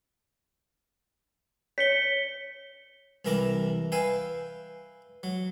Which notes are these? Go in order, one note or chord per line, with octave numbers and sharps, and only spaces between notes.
C#5 B6 C#7 G7
C2 E3 E4 A#4 A#5 D6
B4 E5 F5 G5 G#5
F#3